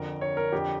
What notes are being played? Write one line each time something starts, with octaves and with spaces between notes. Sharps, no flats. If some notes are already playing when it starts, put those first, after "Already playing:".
Already playing: F2 D3 A#4
C#5
A#4
F2 D3 G4